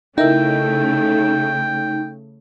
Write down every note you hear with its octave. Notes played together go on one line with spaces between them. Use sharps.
C#3 A3 D#4 E4 A#4 E5 G5